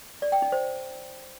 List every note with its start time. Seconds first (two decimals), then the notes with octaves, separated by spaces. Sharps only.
0.22 D5
0.32 G5
0.42 D#4
0.52 C5